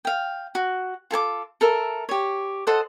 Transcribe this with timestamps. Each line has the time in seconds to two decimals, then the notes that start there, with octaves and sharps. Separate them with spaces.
0.05 F5 G5
0.55 F#4
1.11 F4 A4 G#5 D6
1.61 A4 A#4 E5
2.09 G4 C#5
2.67 A4 C5 D#5 F#5